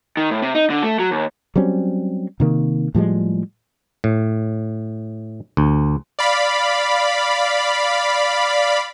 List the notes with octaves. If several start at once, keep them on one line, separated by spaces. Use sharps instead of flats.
D#3
A2
C3
D#4
D3
A3
F#3
D#2
F#3 G3 C4 C#4
C3 D#3 A#3
A2 F3 G3 G#3
A2
D2
D5 F5 B5